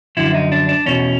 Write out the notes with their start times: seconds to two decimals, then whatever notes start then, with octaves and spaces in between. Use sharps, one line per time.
0.17 F#2 D3 F3 E4
0.34 D#4
0.52 D4
0.69 D4
0.86 E2 B2 C#4